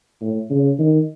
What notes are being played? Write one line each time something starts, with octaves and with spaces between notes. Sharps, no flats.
A2
C#3
D#3